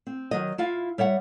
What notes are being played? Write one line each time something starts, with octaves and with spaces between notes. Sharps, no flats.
C4
D#3 F#3 D#5
E4 F4 F5
G3 C#5 E5 F#5